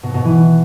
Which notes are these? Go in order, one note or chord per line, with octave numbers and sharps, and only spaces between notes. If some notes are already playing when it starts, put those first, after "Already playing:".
B2
B2
E3